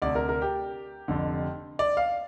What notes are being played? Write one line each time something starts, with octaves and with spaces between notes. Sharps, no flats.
D2 C3 D5
A#4
A#4
G4
F1 F2 D3
D5
F5